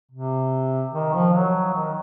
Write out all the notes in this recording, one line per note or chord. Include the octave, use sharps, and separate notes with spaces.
C3
D#3
F3
F#3
D#3